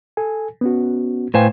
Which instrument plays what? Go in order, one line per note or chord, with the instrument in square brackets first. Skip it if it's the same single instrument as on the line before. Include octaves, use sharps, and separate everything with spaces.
[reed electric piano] A4 G#5
B3 C#4 F#4
[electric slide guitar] A2 C5 G#5 [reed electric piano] B4 F5 G5